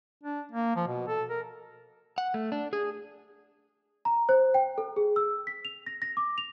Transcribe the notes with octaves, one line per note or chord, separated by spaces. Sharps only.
D4
A#3
F3
B2
A4
A#4
F#5
A3
D4
G#4
A#5
C5
G5
A4
G#4
E6
B6
F7
A#6
A#6
D6
F7